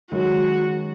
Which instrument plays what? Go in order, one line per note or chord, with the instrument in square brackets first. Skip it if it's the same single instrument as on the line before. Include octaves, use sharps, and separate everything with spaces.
[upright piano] F#2 D#3 G#3 C#4 [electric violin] F#4